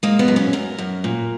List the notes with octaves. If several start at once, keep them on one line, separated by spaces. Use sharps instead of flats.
G#3 A#3
B3
F#2
C#4
F#2 A#4
F#2
A#2